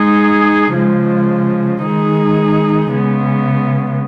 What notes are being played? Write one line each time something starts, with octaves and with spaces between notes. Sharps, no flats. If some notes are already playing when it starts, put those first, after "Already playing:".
Already playing: G#3 D#4 G#4
C#3 F3 G#3
D#3 G#3 D#4 G#4
C#3 G#3 B3